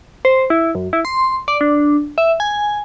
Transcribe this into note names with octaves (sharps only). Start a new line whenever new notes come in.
C5
E4
F#2
E4
C6
D5
D4
E5
G#5